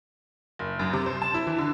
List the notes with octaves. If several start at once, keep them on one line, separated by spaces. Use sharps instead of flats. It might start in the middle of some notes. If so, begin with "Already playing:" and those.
F#1
F#2
C3
C5
A5
E4
E3
D3